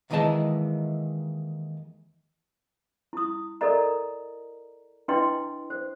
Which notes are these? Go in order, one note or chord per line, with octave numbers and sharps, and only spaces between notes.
D#2 D#3 E3 G#3 D#5 A5
E4 D#6
A4 A#4 D5 D#5 A#5
D4 E4 B4 D#5 G5 C6
C5